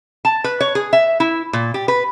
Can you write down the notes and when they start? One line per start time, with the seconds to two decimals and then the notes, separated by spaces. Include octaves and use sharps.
0.25 A5
0.44 B4
0.61 C#5
0.75 G#4
0.93 E5
1.20 E4
1.53 A#2
1.74 G4
1.88 B4